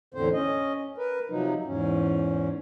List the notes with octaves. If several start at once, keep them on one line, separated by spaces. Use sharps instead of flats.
E2 A2 D3 C4 C5
C#4 D#5
A#4 B4
C3 F3 F#3 D#4
E2 G#2 C#4